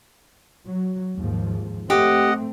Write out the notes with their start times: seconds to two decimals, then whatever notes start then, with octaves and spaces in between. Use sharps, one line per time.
0.66 F#3
1.18 D#2 G#2 F3
1.90 A3 C4 G4 D#5 F#5